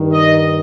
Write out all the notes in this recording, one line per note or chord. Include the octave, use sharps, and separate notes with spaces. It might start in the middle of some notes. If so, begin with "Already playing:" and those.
Already playing: G2 D#3
D#5